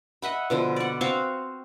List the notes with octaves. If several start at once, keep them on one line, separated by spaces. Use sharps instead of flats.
D#5 E5 F#5 B5
B2 D3 F3
D5 F#5
C4 F#4 F5 C#6